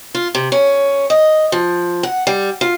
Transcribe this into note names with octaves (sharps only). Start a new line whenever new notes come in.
F4
C3
C#4
D#5
F3
F#5
G3
F4